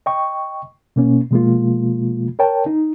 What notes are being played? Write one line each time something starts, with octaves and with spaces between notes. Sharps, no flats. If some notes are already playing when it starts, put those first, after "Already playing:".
D#5 G5 C#6
B2 A#3 C#4
B2 F3 G#3 A#3 F4
A#4 C#5 G5 A5
D#4